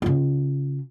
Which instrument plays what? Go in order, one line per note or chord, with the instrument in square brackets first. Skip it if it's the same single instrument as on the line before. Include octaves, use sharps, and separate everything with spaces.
[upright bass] C#3 F4